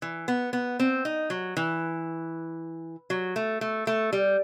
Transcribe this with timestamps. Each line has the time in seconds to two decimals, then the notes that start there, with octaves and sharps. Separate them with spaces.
0.02 E3
0.28 B3
0.53 B3
0.80 C4
1.05 D#4
1.30 F#3
1.57 E3
3.10 F#3
3.36 A3
3.61 A3
3.87 A3
4.13 G3